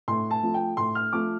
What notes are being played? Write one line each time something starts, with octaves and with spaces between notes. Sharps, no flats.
A2 C6
A5
F3 A3
G5
A2 C6
F6
F3 A3 D6